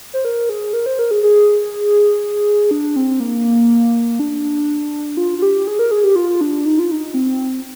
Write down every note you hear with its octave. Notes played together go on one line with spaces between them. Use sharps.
C5
A#4
G#4
A#4
C5
A#4
G#4
G#4
D4
C4
A#3
D4
F4
F4
G4
G#4
A#4
G#4
G4
F4
D4
D#4
F4
D#4
C4